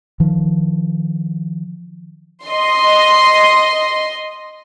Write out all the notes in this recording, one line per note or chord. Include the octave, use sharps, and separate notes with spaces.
D#3 F3
D#5 C6